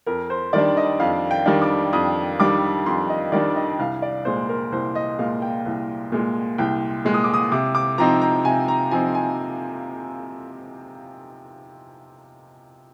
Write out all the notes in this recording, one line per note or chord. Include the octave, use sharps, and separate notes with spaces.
F2 A#4
C5
D#3 G3 D4 D5
D#5
F2 F5
G5
D#3 G3 D4
D6
F2 D#6
D#3 G3 D4 D6
F2 C6
D#5
D#3 G3 D4 D5
D#5
C2 F5
D5
A#2 G#3 C5
A#4
C2 C5
D#5
A#2 G#3 F5
G5
C2
A#2 G#3
C2 G5
A#2 G#3
D#6
D6
D#6
C3 D6
D6
F3 C4 D#4 A#5
A#5
C3 G#5
A#5
F3 C4 D#4 G#5
G#5